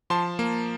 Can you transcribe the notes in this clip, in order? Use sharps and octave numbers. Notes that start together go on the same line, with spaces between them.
F3 A5 C6
A#3